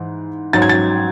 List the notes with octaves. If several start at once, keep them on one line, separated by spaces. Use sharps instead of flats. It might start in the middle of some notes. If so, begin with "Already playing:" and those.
Already playing: G#2 E3
G#2 F#3 C#4 A6
G#6
A6